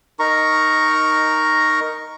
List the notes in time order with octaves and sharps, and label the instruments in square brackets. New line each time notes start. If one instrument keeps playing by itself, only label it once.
[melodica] D#4 A#4 A#5 C#6